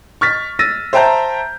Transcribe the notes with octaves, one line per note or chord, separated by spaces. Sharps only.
C#6 F6 A6 B6
E6 A6 A#6 D#7
C5 E5 G5 A5 A#5 G6